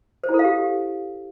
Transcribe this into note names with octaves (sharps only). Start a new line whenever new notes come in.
C5
E4
A4
F5
G4